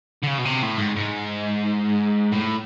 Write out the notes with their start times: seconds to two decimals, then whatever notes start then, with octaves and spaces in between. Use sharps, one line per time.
0.23 D3
0.27 C#3
0.38 B2
0.45 C3
0.62 A2
0.78 G#2
0.96 G#2
2.32 A2